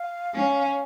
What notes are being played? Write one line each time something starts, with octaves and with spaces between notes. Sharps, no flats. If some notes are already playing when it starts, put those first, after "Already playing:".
Already playing: F5
C#4